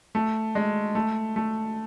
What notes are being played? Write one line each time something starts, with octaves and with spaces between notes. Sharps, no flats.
A3
G#3
A3
A3